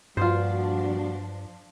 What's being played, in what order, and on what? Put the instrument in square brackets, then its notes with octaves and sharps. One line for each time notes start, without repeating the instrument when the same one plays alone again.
[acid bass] G2 [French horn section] A#2 G3 F#4 [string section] F3 D4 [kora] F4 C5